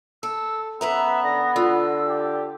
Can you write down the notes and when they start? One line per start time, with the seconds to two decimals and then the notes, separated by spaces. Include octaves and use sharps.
0.23 A4 E6
0.81 F#2 B3 B4 E5 A#5
1.24 D3 A#6
1.56 D3 F4 E6
2.07 G4